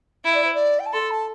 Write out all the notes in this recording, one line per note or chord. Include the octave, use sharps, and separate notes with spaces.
E4 E5
D5
C5
D5
G5
A5
A4 C6
A5